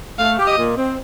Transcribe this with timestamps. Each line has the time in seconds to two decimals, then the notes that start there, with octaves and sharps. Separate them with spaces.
0.18 A3 F5
0.38 G4
0.47 D#5
0.56 A#2
0.76 C4